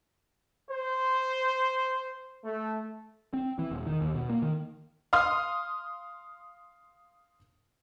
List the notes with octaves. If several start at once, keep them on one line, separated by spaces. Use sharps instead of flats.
C5
A3
C4
E3
E1
D#3
D#2
B2
A#3
D#3
F5 C6 D#6 F6